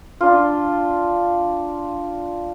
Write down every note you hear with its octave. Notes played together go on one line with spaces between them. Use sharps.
D4 F4